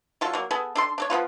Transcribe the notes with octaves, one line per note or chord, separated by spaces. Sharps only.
F#3 F4 A4
F#3 A#3
B3 G#4 A4
D4 A4 C6
D4 A4 C#5
F3 A#3 B3 F4